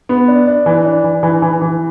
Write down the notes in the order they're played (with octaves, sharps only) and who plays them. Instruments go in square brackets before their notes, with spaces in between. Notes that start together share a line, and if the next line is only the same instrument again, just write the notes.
[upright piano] B3
D4
D4
E3
D4
E3
E3
E3
E3